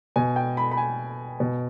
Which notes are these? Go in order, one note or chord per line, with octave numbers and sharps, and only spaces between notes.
B2 G#5
G5
B5
B5
G#5
B2